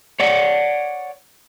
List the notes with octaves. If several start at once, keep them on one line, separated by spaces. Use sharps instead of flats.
C#5 D5 F#5